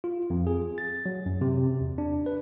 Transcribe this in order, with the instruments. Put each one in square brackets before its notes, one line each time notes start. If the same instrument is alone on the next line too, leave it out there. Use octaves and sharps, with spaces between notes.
[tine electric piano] F4
F2
G#4
A6
F#3
F#2
C3
E2
D4
B4